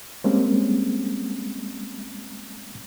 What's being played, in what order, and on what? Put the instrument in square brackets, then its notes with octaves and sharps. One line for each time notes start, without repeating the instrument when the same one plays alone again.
[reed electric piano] G3 G#3 A#3 C4 C#4